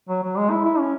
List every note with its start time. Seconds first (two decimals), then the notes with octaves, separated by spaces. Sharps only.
0.09 F#3
0.24 F#3
0.38 G#3
0.51 E4
0.65 E4
0.79 C#4